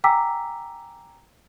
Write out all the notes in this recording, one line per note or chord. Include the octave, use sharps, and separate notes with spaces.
G5 G#5 A#5 D6 E6 B6